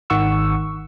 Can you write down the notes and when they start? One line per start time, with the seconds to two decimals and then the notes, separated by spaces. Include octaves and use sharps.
0.10 G#1 D#3 F#5 C#6 E6